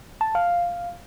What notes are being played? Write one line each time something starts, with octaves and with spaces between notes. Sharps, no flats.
A5
F5